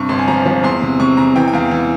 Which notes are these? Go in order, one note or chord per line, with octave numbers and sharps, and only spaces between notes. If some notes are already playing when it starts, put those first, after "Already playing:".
Already playing: G2 C3 C#6
G1 C6
G#5
F3 A#5
F3
E2 C6
C3
C3 C#6
E2 A#5
E3 G5
G5
E2 F5
E3